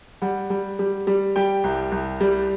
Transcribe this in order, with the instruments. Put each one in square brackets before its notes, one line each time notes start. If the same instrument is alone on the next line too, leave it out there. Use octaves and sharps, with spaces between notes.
[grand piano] G3 F#5
G3
G3
G3
G3 G5
C2
C2
G3